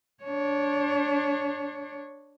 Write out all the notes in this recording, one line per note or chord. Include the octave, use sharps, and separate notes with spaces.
D4 C#5